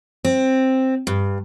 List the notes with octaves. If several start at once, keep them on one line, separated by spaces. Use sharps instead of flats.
C4
G2